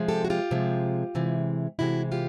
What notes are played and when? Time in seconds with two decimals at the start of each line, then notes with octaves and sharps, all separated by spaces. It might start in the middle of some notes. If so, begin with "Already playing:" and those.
Already playing: C3 F3 G#3
0.08 G4 A4
0.25 F#4
0.30 F4 G4
0.51 C3 F3 G#3
1.15 C3 E3 G#3
1.79 C3 E3 G#3 E4 F#4
2.12 F4 G4